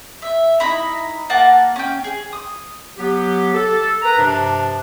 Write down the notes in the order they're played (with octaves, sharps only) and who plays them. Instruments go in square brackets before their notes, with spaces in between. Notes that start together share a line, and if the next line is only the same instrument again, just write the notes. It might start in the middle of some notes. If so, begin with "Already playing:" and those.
[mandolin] E5
D#4 E4 A#5 B5
A#3 A#4 F#5 A5
C#4 G5
G#4
D#6
[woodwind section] F#3 B3 G4
A4
A#4 B4 A#5
G2 C3 F3 D4